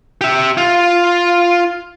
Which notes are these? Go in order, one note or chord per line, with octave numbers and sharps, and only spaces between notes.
G4 E5
F4